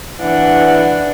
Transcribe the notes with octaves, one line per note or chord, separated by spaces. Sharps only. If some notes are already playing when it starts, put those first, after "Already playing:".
E3 D4 F#5